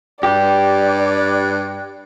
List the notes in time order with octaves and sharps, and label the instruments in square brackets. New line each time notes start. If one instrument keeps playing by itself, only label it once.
[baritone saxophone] G2 [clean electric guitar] G4 [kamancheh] D5